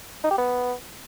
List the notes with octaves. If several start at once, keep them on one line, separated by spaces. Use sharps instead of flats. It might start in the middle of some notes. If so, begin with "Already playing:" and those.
D#4
G4
B3